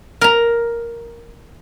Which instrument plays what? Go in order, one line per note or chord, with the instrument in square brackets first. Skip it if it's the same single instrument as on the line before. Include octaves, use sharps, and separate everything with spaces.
[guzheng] A#4 A#5